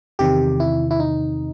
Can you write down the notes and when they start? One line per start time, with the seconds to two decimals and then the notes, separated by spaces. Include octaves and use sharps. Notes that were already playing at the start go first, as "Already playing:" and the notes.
0.19 E2 C3 D#3 G4
0.60 E4
0.91 E4
1.00 D#4